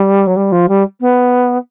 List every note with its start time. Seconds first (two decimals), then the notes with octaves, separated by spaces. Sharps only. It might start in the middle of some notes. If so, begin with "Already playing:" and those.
Already playing: G3
0.27 F#3
0.36 G3
0.52 F3
0.68 G3
1.00 B3